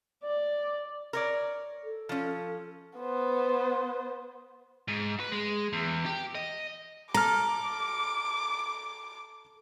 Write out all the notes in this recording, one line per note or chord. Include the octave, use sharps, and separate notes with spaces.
D5
A#4 C#5 D5
A4
F3 C#4
B3 C5
G#2
B4
G#3
E2
G4
D#5
A4 A#5 D6 F6